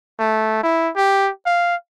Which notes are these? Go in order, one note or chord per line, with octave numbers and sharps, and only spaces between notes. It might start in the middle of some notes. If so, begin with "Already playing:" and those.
A3
E4
G4
F5